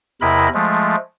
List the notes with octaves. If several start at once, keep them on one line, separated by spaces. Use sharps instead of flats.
E2 C3 E4 A#4 D#5 B5
F3 G#3 A3